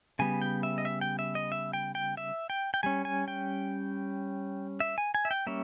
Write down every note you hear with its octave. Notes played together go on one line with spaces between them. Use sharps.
C#3 G3 B3 G#5
G5
E5
D#5
E5
G5
E5
D#5
E5
G5
G5
E5
G5
G5
G3 C#4 G#5
G#5
G5
E5
G#5
G#5
E5
G5
G3 A#3 C#4 E5